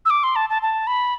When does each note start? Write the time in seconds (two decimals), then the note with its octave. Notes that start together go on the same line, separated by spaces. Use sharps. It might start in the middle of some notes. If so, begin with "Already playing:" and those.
0.05 E6
0.10 D6
0.24 C6
0.36 A5
0.50 A5
0.62 A5
0.87 B5